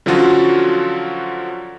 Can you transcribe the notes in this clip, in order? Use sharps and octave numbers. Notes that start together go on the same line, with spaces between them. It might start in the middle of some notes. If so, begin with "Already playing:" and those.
D3 F3 F#3 C#4 F4 F#4